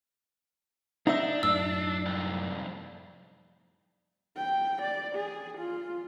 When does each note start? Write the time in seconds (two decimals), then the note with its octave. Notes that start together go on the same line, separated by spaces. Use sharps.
1.07 D4 D#4 E5
1.43 F#2 A2 E6
2.06 C2 F2
4.37 G5
4.82 D5
5.16 G#4
5.58 F4